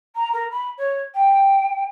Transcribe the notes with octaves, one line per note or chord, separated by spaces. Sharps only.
A#5
A#4
B5
C#5
G5